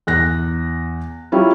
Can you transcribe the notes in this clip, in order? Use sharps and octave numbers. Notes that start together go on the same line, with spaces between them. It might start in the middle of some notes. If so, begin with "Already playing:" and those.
E2 F#6 A#6
F#3 G3 C#4 E4 F4